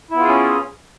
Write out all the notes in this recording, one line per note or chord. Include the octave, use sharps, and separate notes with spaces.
B3 C#4 E4 F4 G#4